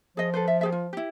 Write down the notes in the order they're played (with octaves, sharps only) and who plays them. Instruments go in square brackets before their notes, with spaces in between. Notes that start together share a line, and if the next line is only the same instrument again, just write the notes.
[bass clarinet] F3 [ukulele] G#4 D#5
[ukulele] A4 B4 C5
E5
G4 G#4 E5
F4
E4 G4